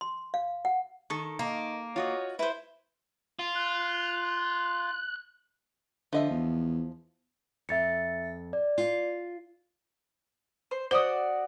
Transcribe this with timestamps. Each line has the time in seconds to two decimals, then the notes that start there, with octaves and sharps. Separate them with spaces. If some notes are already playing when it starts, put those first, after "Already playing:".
0.01 C6
0.34 F5
0.65 F#5
1.10 D#3 A4 C#6
1.39 A#3 D#4
1.96 F4 F#4 C#5 D#5
2.39 E4 B4 C5
3.39 F4
3.55 F#6
6.13 D3 F3 D#5 E5
6.31 E2
7.69 F2 E5 A6 C#7
8.53 D5
8.78 F4
10.71 C5
10.91 F#4 C5 D5 D#6